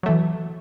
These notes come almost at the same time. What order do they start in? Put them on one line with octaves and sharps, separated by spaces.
F#3 A3 E3